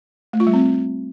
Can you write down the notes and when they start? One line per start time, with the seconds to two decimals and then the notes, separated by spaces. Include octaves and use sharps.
0.33 A3
0.40 F4
0.47 G3
0.53 C4